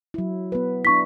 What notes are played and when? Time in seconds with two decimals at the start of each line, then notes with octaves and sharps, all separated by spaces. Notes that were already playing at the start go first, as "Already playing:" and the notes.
0.14 F#3 E4
0.52 B3 B4
0.85 D4 E4 C#6 B6